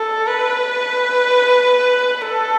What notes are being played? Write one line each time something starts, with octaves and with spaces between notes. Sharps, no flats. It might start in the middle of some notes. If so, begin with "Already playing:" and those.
Already playing: A4
B4
A4